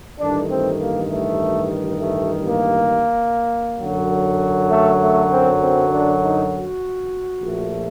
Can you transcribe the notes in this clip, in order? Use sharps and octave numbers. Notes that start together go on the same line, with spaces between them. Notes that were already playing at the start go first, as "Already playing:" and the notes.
A1 G2 D#3 A3 D4
C4
A#3
A3
A3
A#3
F#2 D3 F#3
A3
A3
C4
C4
D4
D#4
F#4
A#1 A#2 A3